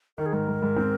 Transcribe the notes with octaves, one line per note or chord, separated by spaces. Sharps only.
D#3 A#4
G#4
G#2 A#4
G#2
G#2
C4